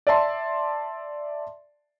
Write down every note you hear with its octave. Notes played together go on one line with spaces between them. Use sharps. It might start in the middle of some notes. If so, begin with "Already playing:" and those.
D5 E5 A5 C6